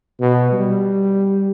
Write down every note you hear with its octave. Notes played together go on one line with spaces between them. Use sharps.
B2
G3